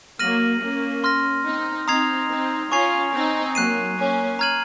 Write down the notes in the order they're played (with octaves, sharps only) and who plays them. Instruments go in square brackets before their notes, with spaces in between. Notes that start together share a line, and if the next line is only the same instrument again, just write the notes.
[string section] F#3 A#3 [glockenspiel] F6 A#6 D#7 F#7
[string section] A#3 C#4
[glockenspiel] C6 F6 A#6
[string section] C4 D#4
[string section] C4 D#4 [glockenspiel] A#5 D#6 G#6 C7 F7
[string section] C4 D#4
[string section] C#4 F4 [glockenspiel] G#5 C#6 G#6 C7 F7
[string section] C4 D#4
[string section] F#3 A#3 [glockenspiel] F#6 C7 D#7
[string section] A#3 C#4
[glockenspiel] A#5 F6 G#6 D#7 F#7